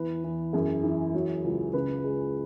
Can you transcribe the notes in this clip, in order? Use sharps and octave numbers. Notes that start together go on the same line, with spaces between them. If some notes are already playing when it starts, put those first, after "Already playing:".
Already playing: E2 B4
E2
F#2 G#4
E3
F#3
C#2
C#3 B4
G#3